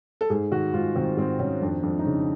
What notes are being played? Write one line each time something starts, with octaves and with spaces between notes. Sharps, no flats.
A4
G#2 G#4
D#3 F#4
G#2 F4
D#3 C4
G#2 C4
D#3 C#4
F2 D4
F2 D4
D#4
C#3 D4